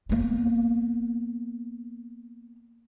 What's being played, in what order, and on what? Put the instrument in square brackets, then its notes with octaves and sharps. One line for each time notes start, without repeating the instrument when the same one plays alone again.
[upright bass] A#3 B3